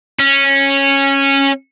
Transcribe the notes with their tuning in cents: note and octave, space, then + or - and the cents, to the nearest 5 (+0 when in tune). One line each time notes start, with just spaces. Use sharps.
C#4 -10